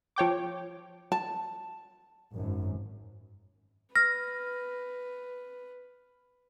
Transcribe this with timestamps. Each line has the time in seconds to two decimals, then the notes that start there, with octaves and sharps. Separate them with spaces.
0.16 F3 C#5 G5 D6
1.12 A5
2.33 G#1 F#2
3.96 B4 F6 A#6